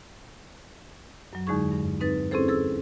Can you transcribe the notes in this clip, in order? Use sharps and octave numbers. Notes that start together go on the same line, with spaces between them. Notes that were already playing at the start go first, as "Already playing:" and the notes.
F#2 F#3
E2 D3 G#3 D#4 G#4 C#6
G2
C4 D#4 B4 A6
C4 C#4 E4 G#4 A4 C5
G#4 A4 E6